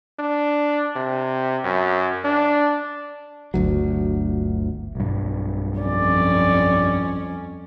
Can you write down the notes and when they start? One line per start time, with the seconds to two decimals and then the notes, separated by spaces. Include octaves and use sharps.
0.19 D4
0.96 C3
1.64 F#2
2.25 D4
3.54 G1 D2 F#3
4.95 B1 G2
5.79 F2 C#4 D5